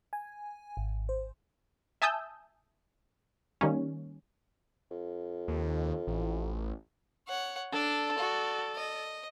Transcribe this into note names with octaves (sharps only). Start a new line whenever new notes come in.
G#5
G#1
C5
E5 G#5 A5 D#6 E6 G6
D#3 G3 A#3 C#4
F2
D#2
A1
C#5 F#5
D4 A4 D5
F#4
D#5